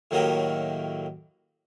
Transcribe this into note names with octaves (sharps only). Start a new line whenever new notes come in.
A2 D#3 F#3 A#3 D#4 G4